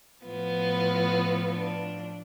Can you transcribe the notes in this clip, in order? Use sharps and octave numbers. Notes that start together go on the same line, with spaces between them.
A2 F3 B3
D4